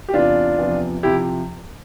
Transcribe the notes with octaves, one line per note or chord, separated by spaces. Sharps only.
G4
E2 C3 E3 D4 F4
E2 C3 F3
C3 F3 E4 G4